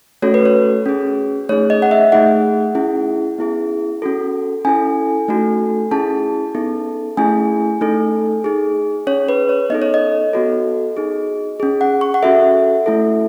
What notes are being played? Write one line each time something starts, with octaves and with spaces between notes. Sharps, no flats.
A3 C#4 F#4 A4 C#5
B4
C#5
C#4 G#4
A3 D#4 G#4 C#5
D#5
F#5
E5
A3 D#4 G#4 F#5
C#4 E4 G#4
B3 E4 G#4
C#4 F#4 A4
C#4 E4 A4 G#5
A3 D#4 F#4 A4
C#4 E4 G#4 A5
B3 D#4 A4
A3 C#4 E4 G#4 G#5
A3 D#4 A4
D#4 G#4
C#4 G#4 C#5
B4
C#5
B3 D#4 A4 D#5
C#5
D#5
B3 F#4 A4
D#4 G#4
C#4 G#4
F#5
C#6
F#5
C#4 F#4 A4 E5
A3 E4 A4